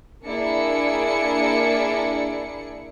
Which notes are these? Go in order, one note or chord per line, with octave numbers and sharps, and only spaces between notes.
A#3 D4 E4 G#4 C#7